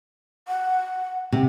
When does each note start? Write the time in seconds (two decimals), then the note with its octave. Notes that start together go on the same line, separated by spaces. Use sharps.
0.48 F#5
1.32 C3